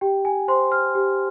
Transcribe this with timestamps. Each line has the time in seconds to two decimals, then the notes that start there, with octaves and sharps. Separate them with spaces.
0.01 G4 G5
0.25 G#5
0.48 C5 C6
0.72 F6
0.95 G4